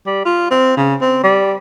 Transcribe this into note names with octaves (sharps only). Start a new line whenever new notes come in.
G3
F4
C4
C#3
C4
G3